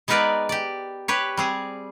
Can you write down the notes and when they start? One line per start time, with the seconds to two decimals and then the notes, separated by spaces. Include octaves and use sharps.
0.08 G#3 B3 D#4 A#4 B4 D5
0.49 G4 D5
1.08 G4 B4 C#5
1.37 G3 C4 G#4